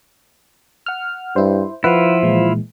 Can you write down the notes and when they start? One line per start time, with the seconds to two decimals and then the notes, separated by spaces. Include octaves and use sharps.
0.86 F#5 F6
1.36 G2 E4 C5
1.84 F3 E4 F4 B4 F#5
2.23 A#2 E3 G#3